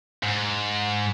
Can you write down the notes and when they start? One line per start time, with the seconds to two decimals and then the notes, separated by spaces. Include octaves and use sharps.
0.23 G#2